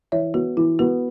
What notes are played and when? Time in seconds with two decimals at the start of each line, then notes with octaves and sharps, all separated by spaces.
0.12 E3 C#5 E5
0.34 B3 F#4
0.57 E3 E4
0.79 B3 F#4